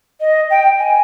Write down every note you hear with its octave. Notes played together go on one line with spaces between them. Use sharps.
D#5
G5
G#5